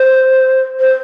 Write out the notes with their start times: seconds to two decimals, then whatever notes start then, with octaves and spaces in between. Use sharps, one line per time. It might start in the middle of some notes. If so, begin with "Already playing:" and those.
Already playing: C5
0.80 C5